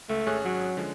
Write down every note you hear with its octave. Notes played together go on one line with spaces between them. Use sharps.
C#2 A3
G#1 C#4 G#4 F#6
F#3
D3 F3 G#3